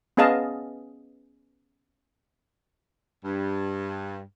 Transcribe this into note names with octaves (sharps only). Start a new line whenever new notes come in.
B3 C#4 G#4 D#5 F5 A5
G2